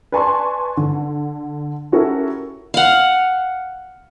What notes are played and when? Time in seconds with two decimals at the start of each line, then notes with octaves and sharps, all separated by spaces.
0.12 B4 D5 G#5 A5 C6 C#6
0.77 D3
1.92 C#4 E4 F#4 G4 A4 A#4
2.74 F5 F#5